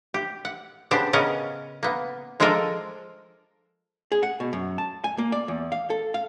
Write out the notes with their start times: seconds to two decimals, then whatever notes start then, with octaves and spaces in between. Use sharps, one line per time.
0.14 G4
0.45 F#5
0.91 C#3 B3 D4 G4 C5
1.13 C#3 B3 C#4 A#4 D#5 F#5
1.83 A#3 B3
2.40 F3 G#3 F4 A4 A#4 D5
4.12 G#4
4.23 F#5
4.40 B2
4.53 F#2
4.78 A5
5.04 G#5
5.18 A#3
5.32 D5
5.48 E2
5.72 F5
5.90 A4
6.14 F5